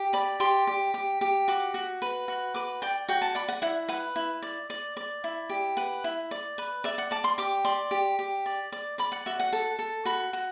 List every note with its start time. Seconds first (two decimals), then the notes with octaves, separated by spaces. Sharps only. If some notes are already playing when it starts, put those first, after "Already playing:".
Already playing: G4
0.13 D5 B5
0.40 G4 C6
0.67 G4
0.94 G4
1.21 G4
1.48 F#4 D6
1.74 F#4
2.02 B4
2.28 F#4
2.54 B4 D6
2.82 D5 G5
3.09 F#4 G5
3.22 A5
3.35 D5 B5
3.49 F#5
3.62 E4 F#5
3.89 B4 F#5
4.16 E4
4.42 D5
4.70 D5
4.97 D5
5.24 E4
5.50 G4
5.77 B4 F#5
6.04 E4
6.31 D5
6.58 B4
6.84 D5 E5
6.98 F#5
7.11 D5 A5
7.24 C6
7.38 G4 D6
7.65 D5 C6
7.91 G4
8.19 G4
8.46 D5
8.72 D5
8.98 D5 B5
9.12 F#5
9.26 F#4 E5
9.40 F#5
9.53 A4
9.79 A4
10.05 F#4 B5
10.33 F#4